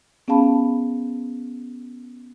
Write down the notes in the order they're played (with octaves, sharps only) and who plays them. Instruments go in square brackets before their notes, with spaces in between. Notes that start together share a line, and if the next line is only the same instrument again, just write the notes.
[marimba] B3 C#4 G#4 F5 A5 B5